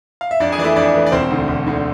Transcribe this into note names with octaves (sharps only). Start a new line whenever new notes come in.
F5
E5
F2 D4 D5
G#4 G#5
E3 A3 E4 D5 E5
F2 D4 D5
E3 A3
D5
E1 C4 C5
D2 D3
E1
D2 D3